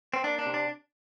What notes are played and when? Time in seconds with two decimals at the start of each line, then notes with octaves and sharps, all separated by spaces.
0.14 C4
0.24 A#3 D4
0.39 D4
0.46 C3
0.54 D4